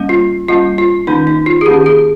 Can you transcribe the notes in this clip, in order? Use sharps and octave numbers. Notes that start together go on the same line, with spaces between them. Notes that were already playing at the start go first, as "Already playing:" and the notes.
Already playing: G3 A#3 C#4
F4
G3 A#3 C#4 F4
F4
D#3 A#3 C#4 D#4
D#4
F4
G#4
D#3 A#3 C#4 G4
G#4